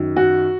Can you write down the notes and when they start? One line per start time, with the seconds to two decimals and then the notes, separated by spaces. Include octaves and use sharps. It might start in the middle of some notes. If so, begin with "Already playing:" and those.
Already playing: F#2 D#3
0.16 F#4